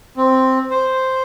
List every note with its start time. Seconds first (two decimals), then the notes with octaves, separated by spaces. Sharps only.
0.17 C4
0.71 C5